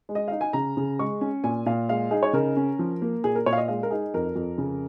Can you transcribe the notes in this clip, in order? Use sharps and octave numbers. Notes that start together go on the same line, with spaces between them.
G#3
D#5
D#4 F5
G#5
C#3 A#5
C#3
G#3 C#6
C#4
A#2 G#5
A#2 F5
G#3 F5
D#4 G#4
C#5
C#3 A#4
C#4
F3
A#3
A#2 G#4
A#4
A#2 C#5
F5
D#5
G#3 F5
A#4
D#4 G#4
F2 A#4
F2
C#3